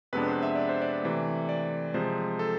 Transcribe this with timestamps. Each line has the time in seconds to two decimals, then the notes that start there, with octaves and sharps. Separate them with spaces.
0.13 F2 C3 G#3 B3 D4 B4
0.28 C5
0.43 E5
0.56 D5
0.69 C5
0.82 D5
1.03 C3 E3 A3
1.49 D5
1.94 C3 F3 G#3 C5
2.39 A4